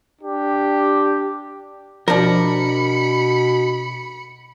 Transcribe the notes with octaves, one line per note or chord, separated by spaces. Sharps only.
D4 G4
B2 F3 D4 A#4 B5 C#7